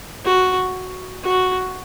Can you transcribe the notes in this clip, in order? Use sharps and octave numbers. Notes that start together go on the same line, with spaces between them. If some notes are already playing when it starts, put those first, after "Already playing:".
F#4
F#4